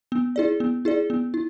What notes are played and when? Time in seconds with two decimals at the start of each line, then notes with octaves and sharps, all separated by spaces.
0.12 B3
0.36 E4 G#4 D5
0.60 B3
0.85 E4 G#4 D5
1.10 B3
1.34 E4